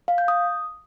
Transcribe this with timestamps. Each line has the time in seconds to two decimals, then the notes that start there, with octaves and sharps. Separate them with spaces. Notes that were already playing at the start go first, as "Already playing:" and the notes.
0.08 F5
0.18 G6
0.28 D#6